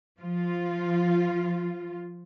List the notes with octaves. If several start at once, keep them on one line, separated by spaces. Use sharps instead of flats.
F3 F4